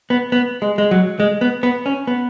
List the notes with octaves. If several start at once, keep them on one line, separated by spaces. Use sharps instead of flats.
B3
B3
G#3
G#3
F#3
G#3
B3
B3
C#4
B3